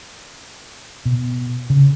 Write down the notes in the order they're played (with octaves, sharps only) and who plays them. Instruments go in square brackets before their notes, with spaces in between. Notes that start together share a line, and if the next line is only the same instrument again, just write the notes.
[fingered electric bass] B2
C#3